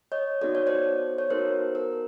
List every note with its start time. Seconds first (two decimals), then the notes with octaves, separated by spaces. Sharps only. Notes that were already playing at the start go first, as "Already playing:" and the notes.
0.12 C#5 D#5
0.41 B3 D#4 F#4 A4 D5
0.55 C#5
0.67 C5 D5
1.18 C#5
1.30 B3 D#4 F#4 A4 A#4 C5
1.75 A#4